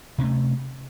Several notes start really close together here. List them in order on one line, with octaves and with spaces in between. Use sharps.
C3 C#4 A3